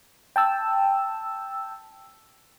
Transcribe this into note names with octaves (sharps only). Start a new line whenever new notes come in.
G5 A5 E6